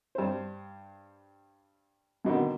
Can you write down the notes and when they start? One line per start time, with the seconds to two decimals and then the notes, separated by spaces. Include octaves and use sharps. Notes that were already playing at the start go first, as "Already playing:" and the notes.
0.15 G2 C5
2.25 G#2 B2 D3 D#3